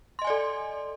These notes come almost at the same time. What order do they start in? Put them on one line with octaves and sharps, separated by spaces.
C6 D#5 G#5 D5 A4